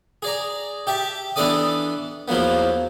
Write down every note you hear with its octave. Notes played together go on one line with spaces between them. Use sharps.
G#4 D5 A#5
G4 E5 A5
E3 B3 D4 A4 D5 D#6
E2 F3 F#3 A#3 B3